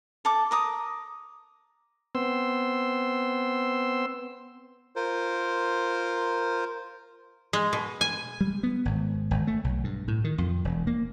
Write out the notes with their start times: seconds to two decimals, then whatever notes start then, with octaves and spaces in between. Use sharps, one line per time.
0.25 A4 A5 D6
0.51 A#4 D6 D#6
2.15 B3 C4 C6 E6
4.96 F4 A#4 C5
7.53 G#3
7.73 B2
8.01 G#5
8.41 G3
8.63 B3
8.85 G#1
9.31 G#1
9.47 A3
9.64 B1
9.84 G2
10.08 A2
10.24 D#3
10.38 F2
10.65 E1
10.87 A#3